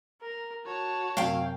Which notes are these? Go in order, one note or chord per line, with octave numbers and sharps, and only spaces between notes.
A#4
F#4 C#5 A5
F#2 C3 F#3 F5 G5